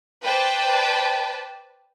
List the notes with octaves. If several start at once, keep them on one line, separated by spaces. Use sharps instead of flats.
B4 C5 D5 G5 A5